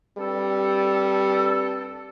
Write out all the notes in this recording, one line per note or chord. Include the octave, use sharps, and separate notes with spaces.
G2 G3 C4 A4